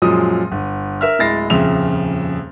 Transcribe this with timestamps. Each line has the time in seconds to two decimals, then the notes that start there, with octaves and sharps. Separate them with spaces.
0.02 F#2 A#2 F3 F#3 G#3 D#6
0.51 G1
1.01 A#4 E5 F6
1.19 D1 G#3 E4 A6 A#6 C7
1.50 D#1 F2 C#3 E5 F7